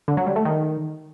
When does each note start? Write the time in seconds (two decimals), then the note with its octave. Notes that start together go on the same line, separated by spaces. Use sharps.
0.08 D3
0.17 F#3
0.27 G3
0.36 A3
0.45 D#3